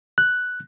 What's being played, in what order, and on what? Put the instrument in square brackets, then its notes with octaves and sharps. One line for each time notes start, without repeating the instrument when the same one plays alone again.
[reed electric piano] F#6